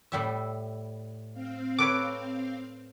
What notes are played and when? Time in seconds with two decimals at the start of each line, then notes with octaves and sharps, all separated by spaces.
0.12 A2 G3 E5
1.33 C4 F5
1.79 A4 B4 C#5 D6